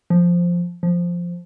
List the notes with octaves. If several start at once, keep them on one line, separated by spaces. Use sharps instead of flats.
F3
F3